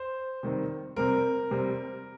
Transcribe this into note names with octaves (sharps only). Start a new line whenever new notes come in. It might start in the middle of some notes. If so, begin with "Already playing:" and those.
Already playing: C5
C3 D#3 G3 C4
C3 G3 C4 A#4
C3 G3 C4